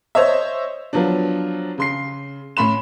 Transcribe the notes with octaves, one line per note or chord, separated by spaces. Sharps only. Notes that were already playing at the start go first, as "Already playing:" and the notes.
C5 C#5 D#5 E5
F3 F#3 B3 D4
C#3 C6 C7
A2 C#4 B5 C6 E7